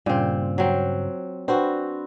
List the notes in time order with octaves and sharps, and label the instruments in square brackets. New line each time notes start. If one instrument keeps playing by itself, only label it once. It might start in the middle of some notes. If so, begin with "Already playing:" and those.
[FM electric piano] G2 C#3 [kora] A#2 C4
[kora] F#3 C4
[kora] C4 F#4 [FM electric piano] D4 B4 C5